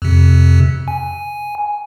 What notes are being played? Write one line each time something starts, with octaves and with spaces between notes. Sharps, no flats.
F2 C3
G#5